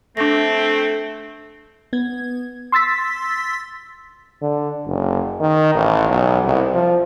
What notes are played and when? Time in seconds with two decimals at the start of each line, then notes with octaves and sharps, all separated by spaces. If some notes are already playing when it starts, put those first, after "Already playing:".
0.17 A3 C4 D4 A#6
1.93 B3 G#6
2.72 C6 E6 A6 B6
4.41 D3
4.86 F#1
5.40 D#3
5.75 A1
6.09 B1
6.44 C2
6.74 F3